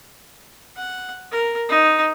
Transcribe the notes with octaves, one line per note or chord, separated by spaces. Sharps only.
F#5
A#4
D#4